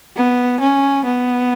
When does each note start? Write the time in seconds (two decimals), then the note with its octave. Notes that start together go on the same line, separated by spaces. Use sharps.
0.16 B3
0.60 C#4
1.05 B3